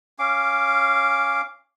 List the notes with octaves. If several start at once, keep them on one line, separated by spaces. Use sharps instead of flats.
C#4 F5 D6